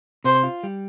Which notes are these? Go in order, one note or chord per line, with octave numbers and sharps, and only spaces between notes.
C3 C5
F4
G3